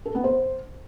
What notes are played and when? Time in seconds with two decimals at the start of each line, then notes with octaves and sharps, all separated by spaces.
0.06 A4
0.15 B3
0.24 C5